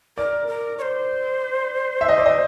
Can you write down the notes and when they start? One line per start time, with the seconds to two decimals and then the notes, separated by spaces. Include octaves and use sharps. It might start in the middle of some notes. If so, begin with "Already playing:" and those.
0.17 A#4 D5
0.47 A#4
0.78 C#5
0.82 C5
2.01 E5
2.08 D#5
2.18 D5
2.26 D#5